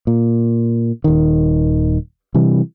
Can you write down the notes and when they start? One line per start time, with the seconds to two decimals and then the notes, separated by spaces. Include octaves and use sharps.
0.07 A#2
1.04 D#1 D#3
2.34 C3 E3 G3